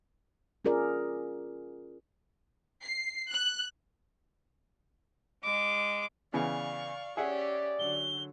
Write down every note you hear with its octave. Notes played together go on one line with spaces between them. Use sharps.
C#4 F4 G#4 A#4 D5
C7
F#6
G#3 D6
C#3 E3 B3 D5 F5 C#6
C#4 G4 G#4 D5 E5 F#5
D3 F#3 G7